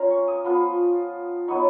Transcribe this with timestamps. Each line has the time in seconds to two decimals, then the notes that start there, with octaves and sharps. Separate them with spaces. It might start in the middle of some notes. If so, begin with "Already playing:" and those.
Already playing: A#3 C#4 F4 G#5 A#5
0.10 C#6
0.28 D#6
0.44 F3 B3 F4
1.48 F#3 B3 D#4 C#6